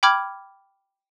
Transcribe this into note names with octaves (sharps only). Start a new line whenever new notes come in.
G5 B5 D6 F6 G#6